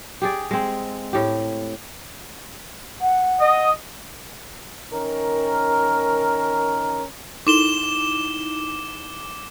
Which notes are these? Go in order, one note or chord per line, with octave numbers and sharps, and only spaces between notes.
G4 G#4 D5
G#3 C4
A2 G4
F#5
D#5
D#3 C#4 A#4
D#4 E4 D6 E7 G7